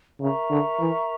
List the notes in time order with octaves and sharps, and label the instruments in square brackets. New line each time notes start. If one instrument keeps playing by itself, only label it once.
[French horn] C#3 [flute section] A#4 E5 A#5 C#6
[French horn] D3
E3